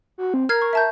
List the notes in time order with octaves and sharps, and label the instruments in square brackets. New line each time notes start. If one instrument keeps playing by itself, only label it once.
[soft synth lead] F#4
C4
[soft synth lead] A#4 [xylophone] F6 G#6 C7
[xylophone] C#6
E5 A5 G6